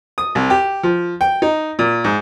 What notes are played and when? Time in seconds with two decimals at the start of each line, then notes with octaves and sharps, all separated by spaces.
0.18 D#6
0.35 C2
0.50 G4
0.83 F3
1.21 G5
1.42 D#4
1.79 A#2
2.04 G#2